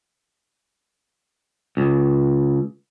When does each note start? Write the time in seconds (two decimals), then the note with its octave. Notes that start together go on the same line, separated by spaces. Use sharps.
1.77 C#2